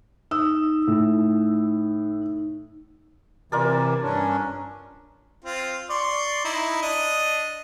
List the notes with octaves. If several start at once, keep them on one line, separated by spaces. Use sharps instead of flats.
D#4 E6
A2
C3 E3 F4 A#4 D5
G2 C#4 D4
C4 F4
D5 C6 C#6
D#4 E4
D4 D#5